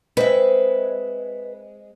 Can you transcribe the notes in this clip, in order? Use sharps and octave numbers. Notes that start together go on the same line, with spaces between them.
G#3 C4 B4 E5